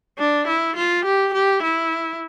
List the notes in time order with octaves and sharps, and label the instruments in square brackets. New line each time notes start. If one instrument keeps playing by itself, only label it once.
[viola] D4
E4
F4
G4
G4
E4